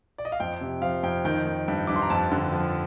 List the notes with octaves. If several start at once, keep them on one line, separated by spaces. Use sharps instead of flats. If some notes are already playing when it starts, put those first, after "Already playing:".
D5
D#5
F5
F2 G5
C3
F3 F5
F2 G5
D#3 G5
D#3
G2
G2 D6
C6
A#5
F2 A5
D3
F3